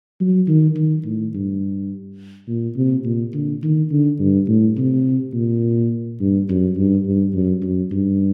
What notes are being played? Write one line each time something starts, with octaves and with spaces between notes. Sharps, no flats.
F#3
D#3
D#3
A2
G2
A#2
C3
A#2
D3
D#3
D3
G2
A2
C3
A#2
G2
F#2
G2
G2
F#2
F#2
G2